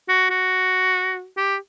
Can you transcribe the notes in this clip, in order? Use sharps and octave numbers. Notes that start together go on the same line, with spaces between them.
F#4
F#4
G4